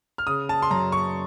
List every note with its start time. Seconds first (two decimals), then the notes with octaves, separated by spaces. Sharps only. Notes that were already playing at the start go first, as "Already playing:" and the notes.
0.18 F6
0.27 C#3 D#6
0.49 A5
0.62 C6
0.71 F#2 A#5
0.92 C#6